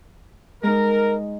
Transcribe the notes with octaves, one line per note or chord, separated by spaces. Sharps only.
G#3 D#4 A#4